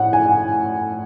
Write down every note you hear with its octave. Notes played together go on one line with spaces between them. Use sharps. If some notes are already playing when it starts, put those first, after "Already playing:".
Already playing: A2 F#5
G#5